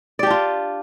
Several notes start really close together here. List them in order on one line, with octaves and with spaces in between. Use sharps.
D5 G4 D4 F4